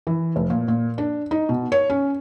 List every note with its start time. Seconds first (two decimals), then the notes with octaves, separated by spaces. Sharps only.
0.07 E3
0.36 F1
0.50 A#2
0.68 A#2
0.98 D4
1.31 D#4
1.49 B2
1.72 C#5
1.90 C#4